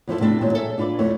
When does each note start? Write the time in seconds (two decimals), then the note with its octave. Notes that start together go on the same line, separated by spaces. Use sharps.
0.08 E2 F3 E4 A4
0.20 C3 A3 D4 E4 A4
0.41 D#2 A#2 D#3 F#3 G#3 A5
0.53 G#4 A4 E5
0.78 D4 F4 B4 C5 D5
0.99 F2 B2 A3 E4 C#5